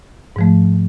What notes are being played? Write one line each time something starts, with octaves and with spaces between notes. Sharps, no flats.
G#2 F3 A3